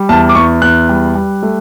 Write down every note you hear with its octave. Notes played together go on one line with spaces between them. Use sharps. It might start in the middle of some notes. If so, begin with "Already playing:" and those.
Already playing: G3
E2 A5
D6
E2 C#6
E2 F#6
G3
G3
A3